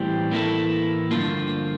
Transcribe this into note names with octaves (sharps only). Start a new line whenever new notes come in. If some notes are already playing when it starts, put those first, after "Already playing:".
Already playing: A2 E3 G3 C4 G4
A2 E3 A#3 E4 A4
G2 D3 F3 A#3 F4